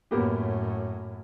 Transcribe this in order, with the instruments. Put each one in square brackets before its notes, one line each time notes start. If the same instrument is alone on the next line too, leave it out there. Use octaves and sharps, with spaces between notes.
[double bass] F#2 A2 [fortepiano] A#3 B3 G4